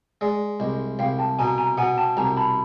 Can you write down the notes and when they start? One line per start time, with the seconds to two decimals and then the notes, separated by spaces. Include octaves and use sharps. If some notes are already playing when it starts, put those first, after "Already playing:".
0.21 G#3 D5
0.60 C2 D#5
0.99 C2 F5 G5
1.18 G5 A5
1.39 B2 G#5 A#5
1.58 G#5 A#5
1.77 B2 F#5 G#5
1.98 G5 A5
2.17 C2 G#5 A#5
2.37 A5 B5